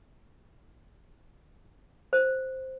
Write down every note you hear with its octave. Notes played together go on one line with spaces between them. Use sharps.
C5